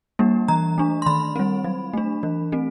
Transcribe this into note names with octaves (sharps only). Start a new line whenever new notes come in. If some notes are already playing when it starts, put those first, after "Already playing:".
G3 A#3 D4
E3 A#5
A3 D4
C6
D#3 B5
G3 C4
F#3
A3 D4
E3
A3 C4